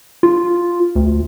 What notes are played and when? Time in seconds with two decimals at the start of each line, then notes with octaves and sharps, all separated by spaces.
0.23 F4
0.96 D2